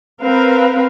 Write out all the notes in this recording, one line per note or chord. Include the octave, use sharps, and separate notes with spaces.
C4 A#4 B4 F5